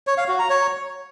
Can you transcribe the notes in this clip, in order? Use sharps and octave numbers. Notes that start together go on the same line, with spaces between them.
C#5
F5
F#4
A#5
C#5